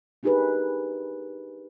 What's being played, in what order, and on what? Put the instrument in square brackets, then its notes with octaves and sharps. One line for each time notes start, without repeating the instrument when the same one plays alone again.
[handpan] D4 D#4 G4 G#4 A#4 B4